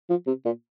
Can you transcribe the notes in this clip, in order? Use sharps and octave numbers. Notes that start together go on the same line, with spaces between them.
F3
C3
A#2